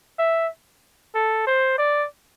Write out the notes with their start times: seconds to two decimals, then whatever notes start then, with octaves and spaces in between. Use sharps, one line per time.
0.19 E5
1.15 A4
1.47 C5
1.78 D5